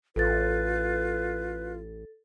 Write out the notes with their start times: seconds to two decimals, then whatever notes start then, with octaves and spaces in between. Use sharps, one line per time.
0.16 A1 F4 A4 B4 A6